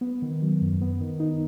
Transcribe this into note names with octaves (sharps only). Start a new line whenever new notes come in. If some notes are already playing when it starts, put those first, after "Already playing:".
B3
D#3
F#3
F#2
B3
D#3
D#4